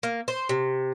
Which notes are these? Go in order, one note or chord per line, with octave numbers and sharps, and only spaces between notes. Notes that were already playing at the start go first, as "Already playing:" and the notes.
A#3
C5
C3